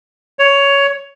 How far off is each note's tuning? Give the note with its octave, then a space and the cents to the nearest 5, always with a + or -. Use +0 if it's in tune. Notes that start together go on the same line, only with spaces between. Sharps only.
C#5 +10